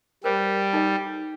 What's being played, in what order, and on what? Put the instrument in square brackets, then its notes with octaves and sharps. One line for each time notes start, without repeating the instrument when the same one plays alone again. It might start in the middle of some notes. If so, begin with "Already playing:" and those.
[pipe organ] G3 [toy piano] A#4 C5
[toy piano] D#4 A4 D#5